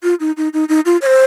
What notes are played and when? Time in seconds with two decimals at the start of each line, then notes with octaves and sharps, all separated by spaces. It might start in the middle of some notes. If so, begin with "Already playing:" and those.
0.03 F4
0.20 D#4
0.37 D#4
0.53 D#4
0.69 D#4
0.85 F4
1.01 C#5
1.06 C5